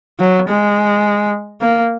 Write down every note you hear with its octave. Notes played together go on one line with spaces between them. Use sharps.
F#3
G#3
A#3